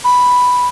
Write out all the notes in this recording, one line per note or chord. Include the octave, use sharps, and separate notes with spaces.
B5